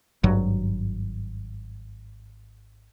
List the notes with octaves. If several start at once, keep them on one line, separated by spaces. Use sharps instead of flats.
G#1 G2 F#3